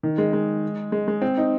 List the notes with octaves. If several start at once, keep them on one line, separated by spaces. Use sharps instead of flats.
D#3
G#3
G#3
G#3
G#3
C4
D#4